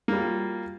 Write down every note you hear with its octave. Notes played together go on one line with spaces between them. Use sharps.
F#3 G3 A#3 F4